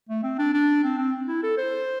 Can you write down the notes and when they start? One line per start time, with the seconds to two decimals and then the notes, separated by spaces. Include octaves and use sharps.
0.09 A3
0.23 C4
0.39 D4
0.54 D4
0.83 C4
0.98 C4
1.28 E4
1.43 A4
1.58 C5